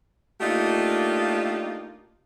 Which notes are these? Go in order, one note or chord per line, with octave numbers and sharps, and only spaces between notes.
A3 A#3 D4 D#4 F4 G4